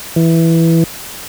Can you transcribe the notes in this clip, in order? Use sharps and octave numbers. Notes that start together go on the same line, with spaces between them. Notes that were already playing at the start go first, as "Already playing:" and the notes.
E3